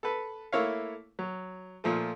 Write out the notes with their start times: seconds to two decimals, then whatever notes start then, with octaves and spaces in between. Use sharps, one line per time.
0.03 A4 B4
0.53 A3 A#3 E4 C#5 F5
1.19 F#3
1.84 A#2 F3 A3